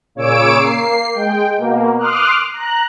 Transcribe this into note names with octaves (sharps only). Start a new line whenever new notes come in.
A#2 C#3 C#5 D6 E6 D7
A#3 C7
G#3 G5
B2 A#3
C6 D6 D#6 F6 F#6
A#5 F#6